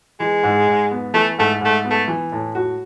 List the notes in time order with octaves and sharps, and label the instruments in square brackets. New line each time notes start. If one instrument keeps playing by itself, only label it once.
[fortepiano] E3 [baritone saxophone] G#3
[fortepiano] G#2
G#2
B3
[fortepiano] E3 [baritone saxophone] A3
[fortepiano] G#2 [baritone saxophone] A3
[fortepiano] G#2 [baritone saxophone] A3
[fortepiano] B3
[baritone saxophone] A3
[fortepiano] E3
A2
F#4